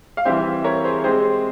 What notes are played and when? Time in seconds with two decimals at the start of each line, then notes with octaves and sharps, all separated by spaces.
0.17 F5
0.25 E3 G3 C4 G4 C5 E5
0.64 A#4 C#5
0.84 G#4 C5
1.04 G#3 C4 G4 G#4 C5